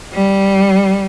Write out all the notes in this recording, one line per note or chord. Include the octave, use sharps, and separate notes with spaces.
G3